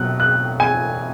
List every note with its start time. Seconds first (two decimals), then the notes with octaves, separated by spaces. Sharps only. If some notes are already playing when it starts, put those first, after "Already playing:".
Already playing: B2 F#3 F#6
0.20 F#6
0.60 G#5